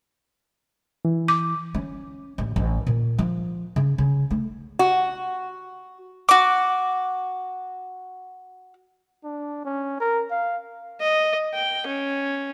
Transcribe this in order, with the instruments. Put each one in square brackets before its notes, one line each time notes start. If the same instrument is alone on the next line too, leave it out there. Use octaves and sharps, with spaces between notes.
[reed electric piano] E3
[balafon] D6
[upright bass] C#4
A1
A1
A#2
F3
C#3
C#3
A3
[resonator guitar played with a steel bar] F#4
[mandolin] F#4 D6
[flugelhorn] D4
C#4
A#4
F5
[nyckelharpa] D#5
G5
C#4